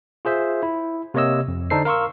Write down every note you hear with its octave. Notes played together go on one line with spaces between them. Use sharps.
F4 G#4 C5 E5
E4
C3 A#3 C#5 D#5 E6
F2
D3 D4 D#4 A4 C5 C7
A#4 F5 C6 C#6 E6